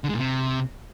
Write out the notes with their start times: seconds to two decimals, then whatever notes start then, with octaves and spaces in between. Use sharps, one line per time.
0.04 D3
0.09 G#3
0.14 A#2
0.19 C3